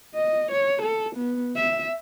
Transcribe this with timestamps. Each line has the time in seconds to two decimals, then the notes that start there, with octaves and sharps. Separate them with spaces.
0.15 D#5
0.52 C#5
0.82 A4
1.16 B3
1.56 E5